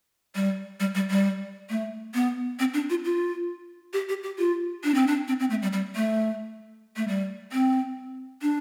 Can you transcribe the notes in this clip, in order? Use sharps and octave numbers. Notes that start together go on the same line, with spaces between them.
G3
G3
G3
G3
A3
B3
C4
D4
F4
F4
G4
G4
G4
F4
D4
C4
D4
C4
C4
A3
G3
G3
A3
A3
G3
C4
D4